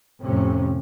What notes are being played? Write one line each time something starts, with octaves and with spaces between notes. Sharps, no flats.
F2 A2 C3 C#4